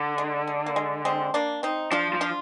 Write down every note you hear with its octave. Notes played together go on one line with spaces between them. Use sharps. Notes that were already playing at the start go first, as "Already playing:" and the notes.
Already playing: D3
G#3
G#3
A#3
G#3
G#3 C4
A#3 D4
C4 D#4
F3 D4 F4
F3
D4 F4